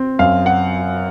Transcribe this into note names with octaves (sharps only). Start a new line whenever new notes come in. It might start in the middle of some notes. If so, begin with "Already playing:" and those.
Already playing: C4
F#2 F5
F#5